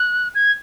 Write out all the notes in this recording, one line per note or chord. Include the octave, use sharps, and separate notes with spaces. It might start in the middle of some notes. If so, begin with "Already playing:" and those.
Already playing: F#6
G#6